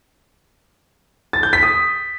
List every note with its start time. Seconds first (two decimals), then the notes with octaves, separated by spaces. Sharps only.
1.33 A6
1.43 G6
1.53 B6
1.63 D#6